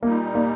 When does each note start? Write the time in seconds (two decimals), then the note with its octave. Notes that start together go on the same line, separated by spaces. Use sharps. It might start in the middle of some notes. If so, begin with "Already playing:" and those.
0.02 A#2 G3 A#3 D#4
0.35 A#3